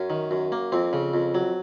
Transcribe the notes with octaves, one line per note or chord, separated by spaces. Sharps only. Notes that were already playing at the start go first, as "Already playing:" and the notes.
Already playing: F#2 C#4
D#3
F#2
A#3
F2 C4
C#3
F2
F#3